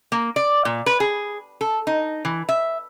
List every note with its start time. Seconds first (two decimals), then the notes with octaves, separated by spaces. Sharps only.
0.12 A#3
0.36 D5
0.65 A#2
0.86 B4
1.00 G#4
1.61 A4
1.87 D#4
2.25 E3
2.49 E5